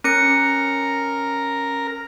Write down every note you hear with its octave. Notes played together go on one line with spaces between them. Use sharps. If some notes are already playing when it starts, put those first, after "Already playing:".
C#4 A#4 C#7